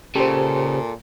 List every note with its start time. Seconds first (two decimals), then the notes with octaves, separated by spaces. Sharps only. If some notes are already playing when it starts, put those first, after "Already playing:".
0.16 A#2 C#3 G4 A4 C5